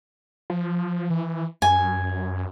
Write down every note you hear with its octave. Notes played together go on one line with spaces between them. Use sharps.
F3
E3
F#2 G#5